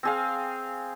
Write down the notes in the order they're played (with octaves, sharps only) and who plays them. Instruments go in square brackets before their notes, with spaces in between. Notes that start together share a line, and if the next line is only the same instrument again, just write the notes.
[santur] C4 G#4 F5